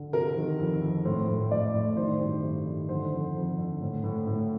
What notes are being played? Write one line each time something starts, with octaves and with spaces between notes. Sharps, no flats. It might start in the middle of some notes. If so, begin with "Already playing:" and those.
Already playing: D3
C3 A#4
D#3
F2
F2
A2 C5
A2
A2 D5
A2
D#3 C5
G2
G2
D#3
D3 C5
F2
F2
D3
A2
A2
A2